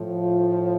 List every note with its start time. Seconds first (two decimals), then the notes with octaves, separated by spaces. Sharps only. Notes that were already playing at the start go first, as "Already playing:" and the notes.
Already playing: A2 F3
0.21 F4